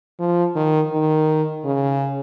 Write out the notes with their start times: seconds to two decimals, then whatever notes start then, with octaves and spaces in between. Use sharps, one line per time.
0.19 F3
0.55 D#3
0.92 D#3
1.65 C#3